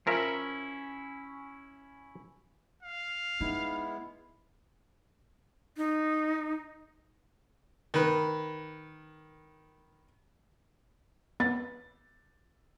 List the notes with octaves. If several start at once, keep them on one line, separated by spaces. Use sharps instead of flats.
F3 C#4 E4 A#4 E5
F5
G#3 B3 D#4 E4
D#4
D#3 B4
B3 A6